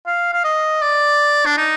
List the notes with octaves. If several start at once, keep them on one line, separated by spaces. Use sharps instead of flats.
F5
F5
D#5
D5
D4
D#4